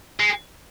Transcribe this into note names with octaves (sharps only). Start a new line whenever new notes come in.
G#3